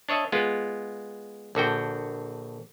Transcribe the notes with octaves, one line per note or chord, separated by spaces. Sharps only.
D4 C#5 D#5 E5
G#3 B3 F4
A#1 D3 F#4 G5